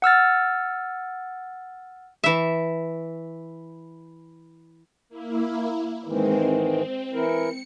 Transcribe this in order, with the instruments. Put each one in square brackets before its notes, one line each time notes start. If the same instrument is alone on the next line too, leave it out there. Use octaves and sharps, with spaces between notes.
[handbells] F#5 E6 F6 A6
[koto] E3 E5
[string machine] A#3 E4
[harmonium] G#2 D#3 E3 [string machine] G#3 C4
[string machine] C4
[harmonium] E3 E4 A#4 [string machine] C#7